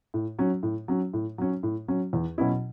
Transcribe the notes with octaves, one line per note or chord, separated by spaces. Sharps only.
A2
F#3 C#4
A2
F#3 C#4
A2
F#3 C#4
A2
F#3 C#4
E2
B2 F#3 C#4 E4